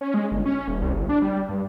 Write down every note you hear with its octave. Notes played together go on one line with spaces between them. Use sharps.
C#4
G#3
G1
C#4
D#1
C2
G1
D4
G3
G2